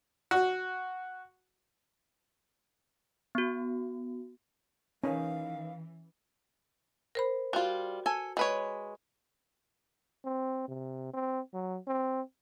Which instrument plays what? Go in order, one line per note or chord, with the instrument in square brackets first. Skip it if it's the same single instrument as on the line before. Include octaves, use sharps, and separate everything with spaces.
[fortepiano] F#4
[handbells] B3 F#4
[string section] E3 [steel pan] C#4 [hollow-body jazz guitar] D#4 A#4 B4 [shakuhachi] F5
[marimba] A#4 C5 B5
[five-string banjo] G3 F4 [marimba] F#4
[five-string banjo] A4 G#5
G#3 B4 C#5
[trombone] C4
C3
C4
F#3
C4